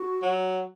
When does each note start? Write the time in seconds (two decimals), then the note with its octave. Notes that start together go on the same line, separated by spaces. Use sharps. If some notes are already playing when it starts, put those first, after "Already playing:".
Already playing: F#4
0.22 F#3